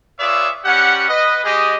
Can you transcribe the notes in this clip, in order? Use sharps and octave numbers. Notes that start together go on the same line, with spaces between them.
F4 G#4 B4 C#5 D5 E5
G3 C#4 G4 F#5
B4 D#5
G#3 G4 G#4 D#5